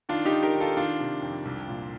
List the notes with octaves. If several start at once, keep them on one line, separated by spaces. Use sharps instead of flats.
D#3 D4 F4
D#4 G4
D#3
G4 A#4
D#3
F4 A4
D#3 D4 F4
C3
F2
C2
A#2